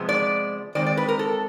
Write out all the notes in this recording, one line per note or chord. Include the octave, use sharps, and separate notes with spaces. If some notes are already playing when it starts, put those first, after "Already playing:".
Already playing: C3 F3 G#3 B3
D5
D#3 G#3 C4 D5
D5
B4
A#4
A4